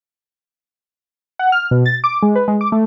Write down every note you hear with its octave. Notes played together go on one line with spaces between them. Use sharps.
F#5
F6
B2
A6
D6
G#3
B4
G#3
D6
A3